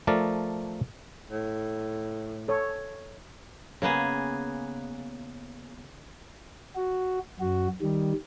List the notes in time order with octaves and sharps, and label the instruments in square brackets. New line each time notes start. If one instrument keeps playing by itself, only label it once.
[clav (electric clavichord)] F3 A3 A#4 D5
[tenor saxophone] A2
[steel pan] A4 C#5
[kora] C#3 A#3 B3 G#4
[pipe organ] F#4
F#2 F#4
D#3 G3